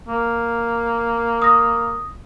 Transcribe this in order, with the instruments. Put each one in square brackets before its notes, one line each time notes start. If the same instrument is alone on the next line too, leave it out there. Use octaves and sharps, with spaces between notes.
[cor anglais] A#3
[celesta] D#6 A#6